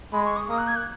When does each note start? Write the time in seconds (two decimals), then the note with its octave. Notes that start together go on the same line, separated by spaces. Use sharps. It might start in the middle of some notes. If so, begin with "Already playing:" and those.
0.13 G#3 B5
0.25 C#6
0.36 D#6
0.48 A#3 D#6
0.58 F#6
0.67 G#6
0.76 F#6